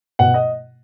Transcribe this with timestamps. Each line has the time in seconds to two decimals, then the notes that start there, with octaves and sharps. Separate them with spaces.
0.19 B2 F#5
0.34 D#5